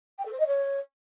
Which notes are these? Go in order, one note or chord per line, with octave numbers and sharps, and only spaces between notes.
G5
A4
C5
D#5
C#5